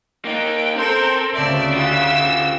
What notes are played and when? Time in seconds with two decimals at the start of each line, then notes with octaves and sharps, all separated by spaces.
0.25 A#3 D#4 G5
0.76 C4 A4 A#4 C5
1.35 D2 C#3 D5 E5 A5
1.74 F4 G4 E6